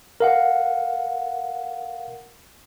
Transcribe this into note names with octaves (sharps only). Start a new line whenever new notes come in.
A#4 F5 F#5